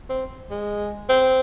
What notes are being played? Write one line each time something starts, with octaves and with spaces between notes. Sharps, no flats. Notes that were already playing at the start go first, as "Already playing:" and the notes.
C4
G#3
C4